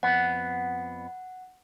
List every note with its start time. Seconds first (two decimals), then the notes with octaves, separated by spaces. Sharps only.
0.03 F2 B3 F#5